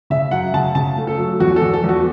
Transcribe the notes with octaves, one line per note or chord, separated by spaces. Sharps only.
C#3 E5
F#2 F#5
C#3 A5
C#3 A5
A3
A4
F#3
E2 F#4
A4
E2
A4
E2 F#4